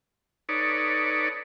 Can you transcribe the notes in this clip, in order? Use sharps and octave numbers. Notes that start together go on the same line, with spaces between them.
D#4 A4 B4 C#5 D5